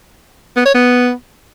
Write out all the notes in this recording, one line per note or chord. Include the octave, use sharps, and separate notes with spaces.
B3
C#5
B3